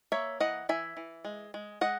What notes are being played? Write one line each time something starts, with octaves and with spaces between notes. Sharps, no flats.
A#3 C#5 E5
E3 D#5 F#5
E3 E5 G#5
E3
G#3
G#3
G#3 D#5 F#5